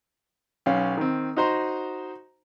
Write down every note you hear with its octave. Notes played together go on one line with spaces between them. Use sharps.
B1 C#4 F5
D#3 C4
D#4 F#4 C5 A#5 C6